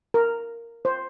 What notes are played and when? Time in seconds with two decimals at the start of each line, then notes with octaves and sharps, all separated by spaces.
0.14 A#4
0.85 C5